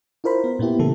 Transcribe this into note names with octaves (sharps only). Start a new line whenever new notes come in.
E4 F4 A#4 C5 B5
B3
A#2 A#3 B3 E4 G4
C#3 E3 A3 A4